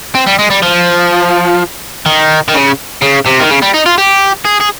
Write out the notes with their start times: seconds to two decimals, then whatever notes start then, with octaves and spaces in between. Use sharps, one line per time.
0.15 C4
0.27 G3
0.39 G#3
0.50 G3
0.63 F3
2.06 D#3
2.48 D#3
2.54 C#3
3.02 C#3
3.26 C3
3.40 D#3
3.50 C#3
3.62 G3
3.74 D#4
3.86 F4
3.98 G4
4.45 G#4
4.61 G#4